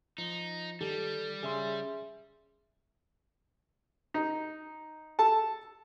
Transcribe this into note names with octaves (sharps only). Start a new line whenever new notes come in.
F3 D#4
D#3 G3 G4 A4
C#3 C#4 G#4 E5 C6
D#4
A4 A5